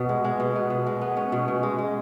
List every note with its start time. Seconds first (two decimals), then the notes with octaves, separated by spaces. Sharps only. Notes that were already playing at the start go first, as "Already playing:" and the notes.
Already playing: B2 B3
0.09 G#3
0.24 G#3
0.40 B2
0.56 B3
0.70 B2
0.86 G#3
1.01 B3
1.17 C#4
1.32 B2
1.48 B2
1.63 G#3
1.78 G#3